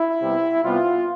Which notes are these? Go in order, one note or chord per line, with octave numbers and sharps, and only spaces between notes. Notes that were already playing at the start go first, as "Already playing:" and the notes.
Already playing: E4
C3 G3 B3
C3 G3 B3 F4